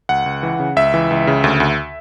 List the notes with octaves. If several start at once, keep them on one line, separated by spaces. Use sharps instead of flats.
C#2 F#5
C#2
E3
C#3
C#2 E5
E3
C#2
C#3
D2
D2